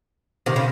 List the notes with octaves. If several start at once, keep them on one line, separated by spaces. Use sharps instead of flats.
C3 D#3
C#3